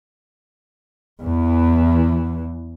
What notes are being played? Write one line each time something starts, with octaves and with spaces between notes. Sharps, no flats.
E2 E3